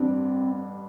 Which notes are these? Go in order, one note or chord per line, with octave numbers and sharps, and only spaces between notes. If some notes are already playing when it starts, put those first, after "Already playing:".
Already playing: A1 G2 G3 C4 D4